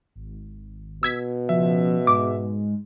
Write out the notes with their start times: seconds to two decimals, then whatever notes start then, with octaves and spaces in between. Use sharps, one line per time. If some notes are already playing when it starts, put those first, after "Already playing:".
0.15 G#1
1.03 B2 E6 G#6 B6
1.49 C#3 F3 E5
2.07 G#2 G#3 D6